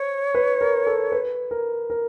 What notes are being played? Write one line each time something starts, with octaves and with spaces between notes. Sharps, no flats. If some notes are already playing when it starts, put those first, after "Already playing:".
Already playing: C5 C#5
B4
A#4
A4
B4
A#4
A#4